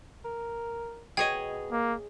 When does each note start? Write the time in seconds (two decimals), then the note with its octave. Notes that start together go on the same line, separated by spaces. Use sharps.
0.25 A#4
1.17 B2 G#4 C#5 D#5 G5
1.71 A#3